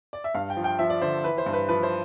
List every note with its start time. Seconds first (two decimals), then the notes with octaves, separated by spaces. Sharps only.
0.13 D5
0.24 E5
0.34 G2 F5
0.50 G5
0.57 F3
0.64 G5
0.79 F3 E5
0.90 D5
1.02 D3 C5
1.24 E3 B4
1.38 C5
1.46 G2
1.53 B4
1.68 F3 B4
1.83 C5